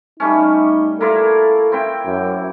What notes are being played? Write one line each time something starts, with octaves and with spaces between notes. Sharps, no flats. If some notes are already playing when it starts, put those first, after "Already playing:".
G3 A3 C#4 D#4
A#3 E4 F4 A4
C4 E4 G5
F#2